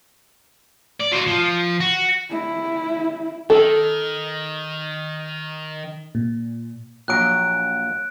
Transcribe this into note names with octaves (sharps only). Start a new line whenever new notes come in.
D5
F#3 C5
F3
F#4
E4
D#3 A4
A#2
A#1 F#3 F#6 D7